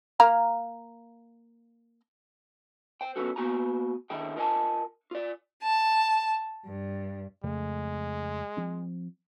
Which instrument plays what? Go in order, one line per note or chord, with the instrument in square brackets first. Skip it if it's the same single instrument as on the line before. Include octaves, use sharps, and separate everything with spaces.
[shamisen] A#3 F5 A#5
[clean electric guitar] C5 G5
F#3 B3 C#4 F#4 A4
A#3 B3 F#4 G#5 A#5
D3 D#3 E4 G#4 G5
F4 A#4 D#5 E5 G#5 A5
F4 D5
[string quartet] A5
G2
[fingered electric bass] F2 C#3 A3 [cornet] G#3
[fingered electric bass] F3 C4